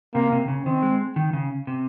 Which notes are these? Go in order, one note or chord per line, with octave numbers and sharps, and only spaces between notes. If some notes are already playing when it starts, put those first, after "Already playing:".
C3 A#3
C3
C#3
D#3 C4
G#3
D#3
C#3
C3